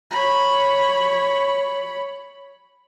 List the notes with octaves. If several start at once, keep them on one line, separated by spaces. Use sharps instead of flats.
C#5 B5